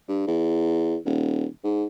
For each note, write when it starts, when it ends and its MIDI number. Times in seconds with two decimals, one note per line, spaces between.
0.08 0.25 43
0.27 0.96 40
1.05 1.45 27
1.64 1.85 44